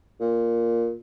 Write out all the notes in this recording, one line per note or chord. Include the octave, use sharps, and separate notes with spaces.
A#2